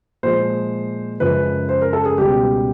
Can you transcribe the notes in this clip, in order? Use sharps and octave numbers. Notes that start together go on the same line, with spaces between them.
A#2 F3 G#3 C5
F#2 C#3 F3 G#3 B4
C5
A#4
A4
G#4
C#2 B2 G3 G4